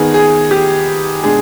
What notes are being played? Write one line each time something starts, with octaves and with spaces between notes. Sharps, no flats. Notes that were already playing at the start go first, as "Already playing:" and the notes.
Already playing: D#3 B3 D#4 G#4
G#4
G4
B2 G#3 D4 G#4